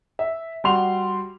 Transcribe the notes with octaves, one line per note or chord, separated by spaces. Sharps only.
E5
G3 F#4 C6 F7